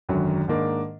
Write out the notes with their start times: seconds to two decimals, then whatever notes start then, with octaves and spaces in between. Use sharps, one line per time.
0.09 G#1 F#2 D3 F#3
0.48 G#2 D#3 A#3 D4